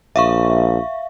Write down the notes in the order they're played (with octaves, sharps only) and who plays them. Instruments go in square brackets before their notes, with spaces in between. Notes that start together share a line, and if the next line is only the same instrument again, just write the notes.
[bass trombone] A#1 [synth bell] E5 F5 C#6